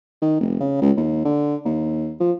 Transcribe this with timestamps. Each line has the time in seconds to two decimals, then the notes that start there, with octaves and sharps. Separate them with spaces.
0.22 D#3
0.40 F1
0.60 C#3
0.82 C#2
0.97 D#2
1.25 D3
1.65 D#2
2.20 F3